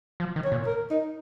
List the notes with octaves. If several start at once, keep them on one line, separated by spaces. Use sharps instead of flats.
F3
D#3
C#5
A#2
A#4
D#4